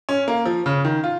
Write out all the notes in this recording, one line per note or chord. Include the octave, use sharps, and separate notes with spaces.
C#4
A#3
F3
C#3
D#3
F4